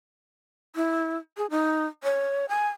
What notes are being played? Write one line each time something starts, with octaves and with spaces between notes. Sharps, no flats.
E4
G#4
D#4
C#5
G#5